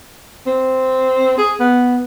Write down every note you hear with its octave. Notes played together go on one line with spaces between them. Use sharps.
C4
G#4
B3